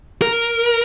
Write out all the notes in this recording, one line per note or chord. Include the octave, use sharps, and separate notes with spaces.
A#4